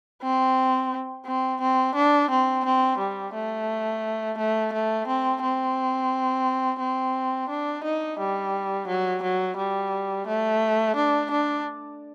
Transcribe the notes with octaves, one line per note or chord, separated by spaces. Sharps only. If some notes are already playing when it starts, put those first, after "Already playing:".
C4
C4
C4
D4
C4
C4
G3
A3
A3
A3
C4
C4
C4
D4
D#4
G3
F#3
F#3
G3
A3
D4
D4